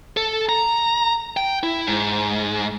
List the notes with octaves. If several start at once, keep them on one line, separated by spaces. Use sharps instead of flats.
A4
A#5
G5
E4
G#2